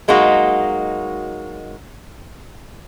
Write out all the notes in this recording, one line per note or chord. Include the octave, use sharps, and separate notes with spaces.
F#3 G#3 A#3 D#4 F#4